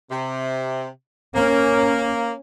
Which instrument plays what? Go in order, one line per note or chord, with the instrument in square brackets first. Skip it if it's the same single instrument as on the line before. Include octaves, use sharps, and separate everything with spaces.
[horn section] C3
[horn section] A#3 [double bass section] C#4